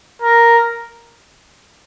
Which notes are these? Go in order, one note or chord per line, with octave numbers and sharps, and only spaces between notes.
A#4